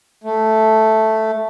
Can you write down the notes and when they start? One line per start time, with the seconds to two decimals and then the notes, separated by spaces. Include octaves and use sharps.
0.24 A3